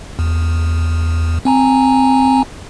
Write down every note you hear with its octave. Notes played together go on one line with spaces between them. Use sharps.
E2
C4 G#5 A#5